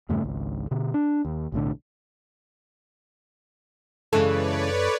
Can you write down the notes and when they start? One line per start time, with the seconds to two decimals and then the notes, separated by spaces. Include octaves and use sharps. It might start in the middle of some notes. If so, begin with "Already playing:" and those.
0.09 E2 G2 C#3 A3
0.22 G#1 C#2
0.71 B2 D3
0.94 D4
1.25 D#2
1.52 B1 A2 D3
4.13 F#2 C#3 E3 G#3 A4 B4 C#5 D5